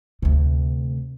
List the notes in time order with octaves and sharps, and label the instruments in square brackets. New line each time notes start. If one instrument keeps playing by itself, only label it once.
[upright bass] D2 C3